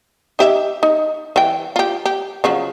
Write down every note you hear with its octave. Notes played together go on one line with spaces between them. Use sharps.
D#4 G4 E5
D#4
E3 G5
F4 G4
G4
C#3 F3 F#3